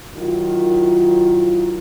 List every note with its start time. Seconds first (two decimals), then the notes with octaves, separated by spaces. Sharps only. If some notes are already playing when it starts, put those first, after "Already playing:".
0.16 D#3 F#3 E4 F4